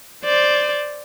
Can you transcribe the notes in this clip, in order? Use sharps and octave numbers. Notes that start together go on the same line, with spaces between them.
C5 D5